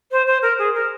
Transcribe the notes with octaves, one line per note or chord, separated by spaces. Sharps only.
C5
C5
A#4
G#4
A#4